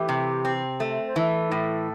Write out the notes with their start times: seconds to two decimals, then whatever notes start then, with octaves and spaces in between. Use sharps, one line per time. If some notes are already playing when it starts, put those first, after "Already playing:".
Already playing: E3 A3 G4
0.09 C3
0.45 C4
0.80 A3
1.08 C5
1.16 E3 A4
1.51 A2